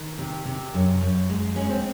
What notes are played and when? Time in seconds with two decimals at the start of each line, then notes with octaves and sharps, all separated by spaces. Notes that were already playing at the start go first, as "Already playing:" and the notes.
Already playing: D#3
0.18 C3
0.46 C3
0.74 F#2
1.01 F#2
1.29 G#3
1.56 G#3 C#4
1.69 C4